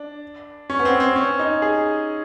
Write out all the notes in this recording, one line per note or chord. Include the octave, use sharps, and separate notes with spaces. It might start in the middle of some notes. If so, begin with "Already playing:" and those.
Already playing: D4
C#4
B3
C4
C4
C#4
D#4
G#4